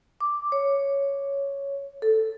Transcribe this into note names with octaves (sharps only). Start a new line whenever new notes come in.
D6
C#5
A4